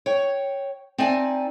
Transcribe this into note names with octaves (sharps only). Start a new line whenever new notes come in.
C#5 G5
C4 D#4 D5 E5 G#5 A5